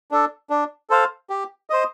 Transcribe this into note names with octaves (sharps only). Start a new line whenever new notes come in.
D4 A4
D4
A4 C5 F5
G4
C5 D#5